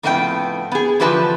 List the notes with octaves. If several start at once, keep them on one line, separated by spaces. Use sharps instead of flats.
F2 A2 C#3 B3 F4 G5
B3 G#4
D3 E3 F3 G4 B4 A5